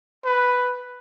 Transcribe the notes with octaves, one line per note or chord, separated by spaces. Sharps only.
B4